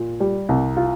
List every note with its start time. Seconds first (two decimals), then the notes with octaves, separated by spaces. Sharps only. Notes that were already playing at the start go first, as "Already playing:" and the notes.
Already playing: A#2
0.20 G3
0.49 C2
0.77 F4